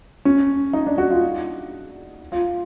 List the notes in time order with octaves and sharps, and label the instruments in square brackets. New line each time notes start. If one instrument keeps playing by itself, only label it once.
[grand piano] C#4
D#4
D4
F#4
F4
F4